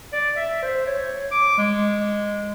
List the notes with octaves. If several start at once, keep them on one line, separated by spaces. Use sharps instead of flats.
D5
E5
C5
C#5
D6
G#3